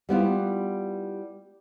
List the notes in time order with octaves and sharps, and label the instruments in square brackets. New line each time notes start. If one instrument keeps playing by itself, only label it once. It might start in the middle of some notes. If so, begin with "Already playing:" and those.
[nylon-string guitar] G3 B3 E4 F4